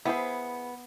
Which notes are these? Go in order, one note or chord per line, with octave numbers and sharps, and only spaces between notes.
B3 E4 G#4 C5